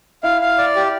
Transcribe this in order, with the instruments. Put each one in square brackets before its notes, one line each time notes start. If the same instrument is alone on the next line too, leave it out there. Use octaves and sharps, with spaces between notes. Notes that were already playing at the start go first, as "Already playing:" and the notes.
[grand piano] E4 [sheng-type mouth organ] F5
[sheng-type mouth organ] F5
D5
G4